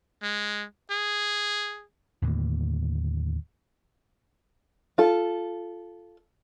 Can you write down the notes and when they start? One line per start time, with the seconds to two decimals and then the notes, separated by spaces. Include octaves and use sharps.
0.23 G#3
0.91 G#4
2.22 D#2 A2 D3 A#3
4.98 F4 A4